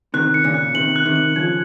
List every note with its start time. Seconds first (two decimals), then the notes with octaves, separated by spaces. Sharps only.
0.14 C3 D#3 F#6
0.34 C#7
0.44 A#2 C#3
0.54 F#6
0.74 C3 D#3 F#7
0.96 F#6
1.05 C3 D#3
1.16 F#7
1.36 C#3 F3 G#6